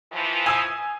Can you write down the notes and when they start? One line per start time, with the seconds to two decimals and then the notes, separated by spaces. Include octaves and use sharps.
0.13 E3 F3
0.46 G#5 D#6 E6